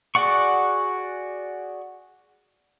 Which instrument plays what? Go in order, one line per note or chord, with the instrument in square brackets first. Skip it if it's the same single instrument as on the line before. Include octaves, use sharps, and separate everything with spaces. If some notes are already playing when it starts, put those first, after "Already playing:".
[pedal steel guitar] F#4 G#4 D5 F#5 C#6